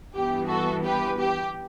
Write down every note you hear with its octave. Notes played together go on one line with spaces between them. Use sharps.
G2 E3 B3 G4
F#4 A4
G4 B4
G4